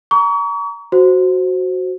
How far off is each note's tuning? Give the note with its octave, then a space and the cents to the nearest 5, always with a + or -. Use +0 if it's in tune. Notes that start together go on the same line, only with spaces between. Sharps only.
A#5 +5 C#6 +40
F#4 +0 C5 +0